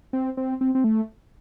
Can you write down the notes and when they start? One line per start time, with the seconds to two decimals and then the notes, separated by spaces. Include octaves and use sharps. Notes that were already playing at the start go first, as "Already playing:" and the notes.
0.13 C4
0.37 C4
0.61 C4
0.75 C4
0.84 A3